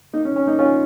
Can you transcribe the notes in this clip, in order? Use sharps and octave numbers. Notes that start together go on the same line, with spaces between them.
A#3 D#4
C#4
C#4
A#3 D#4
C#4 F4